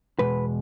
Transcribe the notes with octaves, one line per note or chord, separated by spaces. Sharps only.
E2 B2 G#3 B4